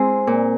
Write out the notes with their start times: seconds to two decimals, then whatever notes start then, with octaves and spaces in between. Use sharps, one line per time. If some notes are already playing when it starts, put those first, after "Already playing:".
Already playing: G#3 C4 E4 G#4
0.27 A#2